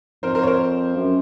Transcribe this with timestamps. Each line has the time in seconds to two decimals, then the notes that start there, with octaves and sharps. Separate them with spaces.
0.23 F2 A#4 C5
0.35 A#4 C5
0.43 C#5
0.47 A#4 C5
0.96 F#2